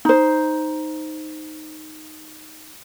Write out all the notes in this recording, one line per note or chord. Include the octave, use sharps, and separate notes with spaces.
D#4 C5